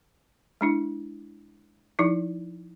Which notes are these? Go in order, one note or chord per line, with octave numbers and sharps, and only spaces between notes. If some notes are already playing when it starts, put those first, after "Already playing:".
G#3 D4 E4
F3 D#4 E4